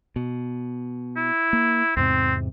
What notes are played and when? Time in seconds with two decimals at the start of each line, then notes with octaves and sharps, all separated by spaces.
0.16 B2
1.17 E4
1.53 A#3
1.97 E2 G#2 C3 C4